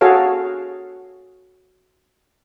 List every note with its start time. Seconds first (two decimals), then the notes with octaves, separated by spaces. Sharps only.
0.01 F#4 G#4 A4 C#5 F5